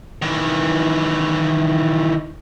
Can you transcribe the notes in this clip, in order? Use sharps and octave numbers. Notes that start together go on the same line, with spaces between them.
D#3 E3